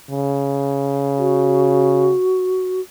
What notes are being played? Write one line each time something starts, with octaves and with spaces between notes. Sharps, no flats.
C#3
F#4